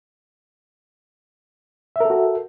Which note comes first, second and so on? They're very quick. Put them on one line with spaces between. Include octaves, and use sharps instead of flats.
E5 A#4 A4 F#4